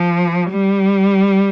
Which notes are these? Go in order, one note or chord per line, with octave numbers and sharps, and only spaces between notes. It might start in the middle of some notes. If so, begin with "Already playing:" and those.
Already playing: F3
G3